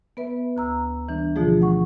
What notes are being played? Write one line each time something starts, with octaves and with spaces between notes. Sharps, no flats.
B3 B4 E5
D2 A#5 E6
E3 G3 D4
B2 D3 F3 A3 F4 G#4
F#5 C#6